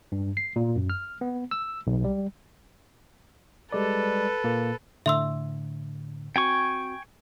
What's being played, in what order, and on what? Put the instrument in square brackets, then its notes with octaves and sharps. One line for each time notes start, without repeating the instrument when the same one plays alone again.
[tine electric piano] G2
C7
A#2
F#2
F6
B3
E6
B1
G3
[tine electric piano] G3 G#3 D5 [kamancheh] A4 B4
[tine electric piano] A#2 A#3
[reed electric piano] A2 D3 [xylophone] E5 C6 E6
[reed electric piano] C4 F#4 [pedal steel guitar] G5 G#5 C#6